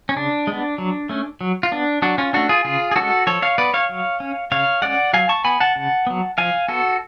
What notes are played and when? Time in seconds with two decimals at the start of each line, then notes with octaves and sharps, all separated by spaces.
0.09 C#4
0.16 C#3 D4
0.47 G#3 B3
0.78 F#3
1.09 A3 C#4
1.41 F#3
1.63 F4
1.72 B3 D4
2.02 F#3 D4 F#4
2.18 C#4 F4
2.33 A3 C#4 D4 F#4
2.49 F4 G#4
2.65 C#3 F4 G#4
2.91 G#4
2.96 G#3 C#4 F#4 A4
3.27 F3 A4 C#5
3.42 C#5 F5
3.58 B3 B4 D5
3.74 C#5 F5
3.89 F#3
4.20 C#4
4.52 C#3 C#5 F5
4.82 G#3 C#4 D5 F#5
5.13 F#3 F5 G#5
5.29 A5 C#6
5.45 B3 G#5 B5
5.60 F#5 A5
5.76 C#3
6.07 F#3 B3
6.38 F3 F5 G#5
6.68 B3 F#4 A4